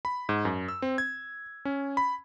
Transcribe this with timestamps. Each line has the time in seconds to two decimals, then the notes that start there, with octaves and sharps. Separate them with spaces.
0.05 B5
0.29 G#2
0.45 F#2
0.68 E6
0.82 C4
0.98 G#6
1.65 C#4
1.97 B5